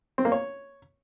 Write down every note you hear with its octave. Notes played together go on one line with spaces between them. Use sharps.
C4
A#3
C#5